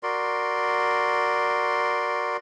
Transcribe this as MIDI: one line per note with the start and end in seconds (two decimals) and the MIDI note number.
0.03 2.37 66
0.03 2.37 70
0.03 2.37 74
0.03 2.37 84